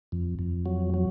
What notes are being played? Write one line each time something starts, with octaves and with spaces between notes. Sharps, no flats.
F2
F2
F#3
F#3